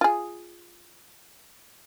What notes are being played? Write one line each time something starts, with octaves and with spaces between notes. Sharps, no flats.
F4 G#4